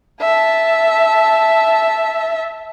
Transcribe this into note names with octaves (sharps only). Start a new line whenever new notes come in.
E5 A5